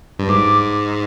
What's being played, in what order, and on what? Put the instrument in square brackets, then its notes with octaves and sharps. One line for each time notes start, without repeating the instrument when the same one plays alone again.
[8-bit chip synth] G2
[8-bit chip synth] G#2 [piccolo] D6